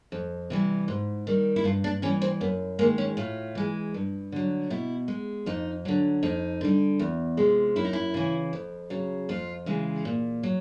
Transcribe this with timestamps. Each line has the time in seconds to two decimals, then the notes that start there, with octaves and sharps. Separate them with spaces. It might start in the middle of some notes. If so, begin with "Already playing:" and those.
0.12 F2
0.50 C3 E3 G3
0.88 G#2
1.27 D#3 G3
1.56 E4
1.64 G2 F4
1.84 D4
2.02 E3 C#4
2.06 G3
2.22 C4
2.41 F#2 B3
2.79 G#3 A#3
2.83 D#3
2.98 C#4
3.17 A2 F4
3.55 E3 G#3
3.94 G2
4.32 D3 F#3
4.70 B2 E4
5.08 G#3
5.46 F2 D#4
5.85 D3 F#3
6.23 F2 D#4
6.61 D3 G3
7.00 E2
7.37 C3 F3 G#3
7.76 F#2 E4
7.85 D#4
7.93 E4
8.14 C#3 E3
8.53 F2
8.90 C#3 F#3
9.29 F2 F4
9.66 C#3 E3 G#3
10.05 A#2
10.43 F#3